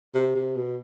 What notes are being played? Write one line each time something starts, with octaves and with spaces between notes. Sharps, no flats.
C3
C3
B2